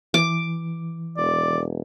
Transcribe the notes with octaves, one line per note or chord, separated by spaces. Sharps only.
E3 D6
E1 D5